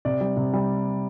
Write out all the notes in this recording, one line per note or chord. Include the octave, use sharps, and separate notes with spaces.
C3 D5
G3
C3
G3